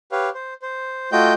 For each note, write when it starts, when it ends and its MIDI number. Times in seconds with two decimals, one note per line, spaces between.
0.12 0.30 67
0.12 0.30 71
0.12 0.30 73
0.12 0.30 77
0.34 0.54 72
0.62 1.10 72
1.12 1.34 57
1.12 1.34 65
1.12 1.34 66
1.12 1.34 75
1.12 1.34 79
1.12 1.34 91